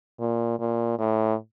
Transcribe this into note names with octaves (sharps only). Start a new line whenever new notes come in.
A#2
A#2
A2